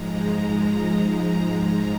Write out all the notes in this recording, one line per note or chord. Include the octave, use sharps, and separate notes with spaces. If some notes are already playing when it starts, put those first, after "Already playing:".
Already playing: G#2 F3 G#3 A#5